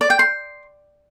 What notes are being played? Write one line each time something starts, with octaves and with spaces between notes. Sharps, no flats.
D5
G5
C6